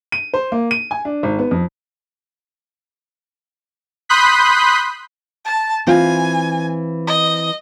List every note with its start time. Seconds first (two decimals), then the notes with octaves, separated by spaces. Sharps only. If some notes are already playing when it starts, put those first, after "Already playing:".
0.12 D#7
0.34 C5
0.52 A#3
0.71 D#7
0.91 G#5
1.05 D4
1.23 G#1
1.39 B3
1.51 F2
4.09 B5 C6 D#6 F#6 G6 B6
5.45 A5
5.87 E3 C4 F4 G#5
7.07 D#5